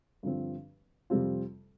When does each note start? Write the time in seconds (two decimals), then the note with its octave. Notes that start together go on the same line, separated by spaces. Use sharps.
0.23 G2 D3 F3 C4
1.10 F2 C3 G3 C4 F4